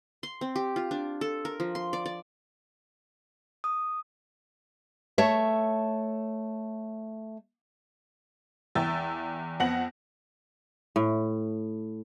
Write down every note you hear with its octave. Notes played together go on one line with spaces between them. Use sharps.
C6
C4
G4
F4
D4
A4
A#4
F3
C6
D5
D5
D#6
A3 C#5 E5
E2 E5 G5 E6 A6
F2 B3 F#5 A#6 F#7
A2